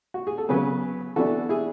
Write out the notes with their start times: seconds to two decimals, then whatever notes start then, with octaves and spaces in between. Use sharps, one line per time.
0.14 F#4
0.27 G#4
0.38 A4
0.49 C#3 F#3 B3 G#4 B4
1.16 E3 B3 D4 F#4 A4
1.49 E4 G#4